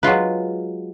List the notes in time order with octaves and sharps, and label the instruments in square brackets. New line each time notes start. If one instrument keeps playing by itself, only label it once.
[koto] F#3 G#3 F4 B4